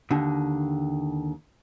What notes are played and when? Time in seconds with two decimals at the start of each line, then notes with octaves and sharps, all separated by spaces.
0.11 D#2 D3